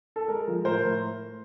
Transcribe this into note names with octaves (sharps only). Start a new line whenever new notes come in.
A4
G#3 A#4
F3
A2 A#4 C5
A2